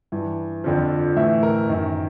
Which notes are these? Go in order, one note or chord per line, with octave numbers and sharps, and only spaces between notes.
G2 E3
F2 D3 F3
A2 E3 E5
A#4
F#2 D#3